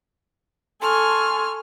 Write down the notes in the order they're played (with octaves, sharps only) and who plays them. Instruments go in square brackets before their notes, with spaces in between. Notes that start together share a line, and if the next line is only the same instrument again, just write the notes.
[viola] A4 G#5 [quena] C6 [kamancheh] C#6 F6